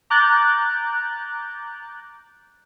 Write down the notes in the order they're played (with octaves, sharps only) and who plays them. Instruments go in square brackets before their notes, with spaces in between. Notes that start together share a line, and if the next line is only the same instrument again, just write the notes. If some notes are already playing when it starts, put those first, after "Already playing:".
[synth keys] A#5 D6 F#6 G6 A6